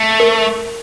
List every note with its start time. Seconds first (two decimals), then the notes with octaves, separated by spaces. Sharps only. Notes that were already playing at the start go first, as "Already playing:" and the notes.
Already playing: A3
0.20 A#4